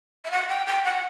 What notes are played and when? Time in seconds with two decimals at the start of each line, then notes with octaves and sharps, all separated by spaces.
0.25 E5
0.31 F#5
0.49 G5
0.66 G5
0.84 F#5